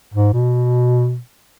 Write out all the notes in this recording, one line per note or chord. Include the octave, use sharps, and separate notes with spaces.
G#2
B2